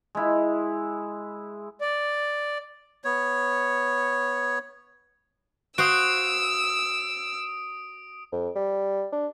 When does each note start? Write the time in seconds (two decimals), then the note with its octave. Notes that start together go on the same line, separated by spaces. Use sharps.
0.15 G#3 E4
1.81 D5
3.04 B3 C#5
5.78 F#4 C5 F5 D#6 E6 D7
8.32 F2
8.56 G3
9.12 D4